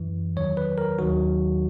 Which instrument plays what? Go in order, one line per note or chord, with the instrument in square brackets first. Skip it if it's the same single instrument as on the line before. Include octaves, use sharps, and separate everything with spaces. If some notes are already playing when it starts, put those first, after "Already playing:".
Already playing: [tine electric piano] F#2 E3
E2 D#3 F#3 C#5
B4
A#4
D#2 D#3 F#3 F#4